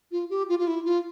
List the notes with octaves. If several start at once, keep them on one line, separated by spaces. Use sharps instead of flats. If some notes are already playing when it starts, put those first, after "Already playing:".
F4
G4
F4
F4
E4
F4